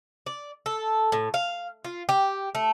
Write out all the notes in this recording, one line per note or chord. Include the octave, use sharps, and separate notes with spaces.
D5
A4
A2
F5
F4
G4
A3